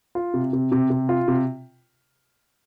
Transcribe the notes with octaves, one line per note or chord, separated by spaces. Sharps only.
F4
C3
C3
C3
C3
F4
C3